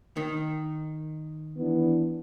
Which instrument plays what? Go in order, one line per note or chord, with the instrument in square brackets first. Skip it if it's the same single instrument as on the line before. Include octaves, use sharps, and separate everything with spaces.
[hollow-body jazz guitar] D#3
[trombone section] E3 B3 D4